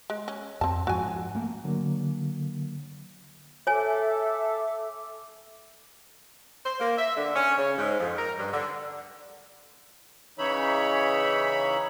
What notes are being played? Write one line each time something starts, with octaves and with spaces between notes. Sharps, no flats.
G#3
C#4
F2 C4 A5
G#2 F3 F#4 G#5
A3 A#3
D3 F#3 A#3
A4 C#5 E5 G#5 D6
C5
A#3
E5
D3
C#4
C#3
G#2
F2
A#4
G2
D3
C#3 E3 D#4 C#5 E5 B5